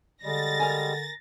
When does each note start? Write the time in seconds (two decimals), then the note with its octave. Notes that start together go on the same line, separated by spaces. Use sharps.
0.24 D3 G3 G#3 A6 A#6
0.60 A#4 G#5